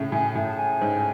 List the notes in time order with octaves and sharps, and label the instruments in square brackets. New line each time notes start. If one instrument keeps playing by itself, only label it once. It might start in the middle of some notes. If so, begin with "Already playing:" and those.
Already playing: [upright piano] A2 C#3
[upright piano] A2 [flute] G#5
[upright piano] A2
[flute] A5
G#5
[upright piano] G#2